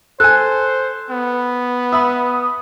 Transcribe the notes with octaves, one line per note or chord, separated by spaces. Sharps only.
A4 C5 G#5 F#6
B3
E5 B5 D#6